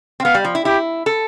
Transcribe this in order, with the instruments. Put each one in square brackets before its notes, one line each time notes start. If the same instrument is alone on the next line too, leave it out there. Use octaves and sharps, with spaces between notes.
[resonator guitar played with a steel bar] C4
[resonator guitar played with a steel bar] B3 [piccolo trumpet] F5
[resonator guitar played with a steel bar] G3
F3
E4
[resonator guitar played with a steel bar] E4 [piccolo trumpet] G4
[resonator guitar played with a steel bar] A4